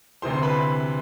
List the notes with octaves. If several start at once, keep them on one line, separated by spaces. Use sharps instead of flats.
D2 C3 E3 C5 C6
C6
B4 B5